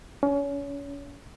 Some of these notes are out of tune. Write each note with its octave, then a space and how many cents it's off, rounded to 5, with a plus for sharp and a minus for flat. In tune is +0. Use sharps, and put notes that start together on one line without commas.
C#4 +30